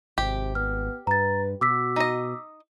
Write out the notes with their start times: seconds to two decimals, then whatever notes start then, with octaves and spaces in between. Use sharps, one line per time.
0.18 G#1 C3 G4
0.55 B3 F6
1.07 G2 B4 A#5 A6
1.61 B2 F#4 D6 E6 B6
1.96 D#4 D#5